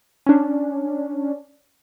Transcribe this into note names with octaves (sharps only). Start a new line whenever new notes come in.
C#4 D4